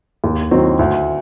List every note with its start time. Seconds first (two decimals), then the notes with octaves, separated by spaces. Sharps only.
0.24 D#2
0.51 D#3 F#3 C4
0.79 D2